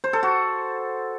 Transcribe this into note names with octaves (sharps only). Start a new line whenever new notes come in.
C5
A4
F#4